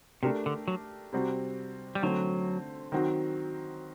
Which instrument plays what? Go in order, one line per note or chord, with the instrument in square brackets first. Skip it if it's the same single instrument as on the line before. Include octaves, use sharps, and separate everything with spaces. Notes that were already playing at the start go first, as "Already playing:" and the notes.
[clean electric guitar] C3 [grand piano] A3 D4 G4 A#4
[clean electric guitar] D3
F#3
[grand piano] C3 G3 C4 F#4
[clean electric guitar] G3
[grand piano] D3 A3 C4 [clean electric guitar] F#3
[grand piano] D#3 F#3 C4 F#4